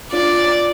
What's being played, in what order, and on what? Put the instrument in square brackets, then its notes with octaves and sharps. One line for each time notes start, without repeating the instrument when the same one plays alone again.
[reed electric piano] D4 F4 [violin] D5